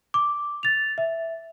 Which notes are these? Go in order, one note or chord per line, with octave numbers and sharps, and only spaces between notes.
D6
A6 F7
E5